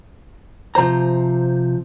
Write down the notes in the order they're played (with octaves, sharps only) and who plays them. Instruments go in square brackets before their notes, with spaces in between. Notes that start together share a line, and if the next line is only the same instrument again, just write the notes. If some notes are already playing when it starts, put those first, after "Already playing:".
[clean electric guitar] C3 F3 C5 A#5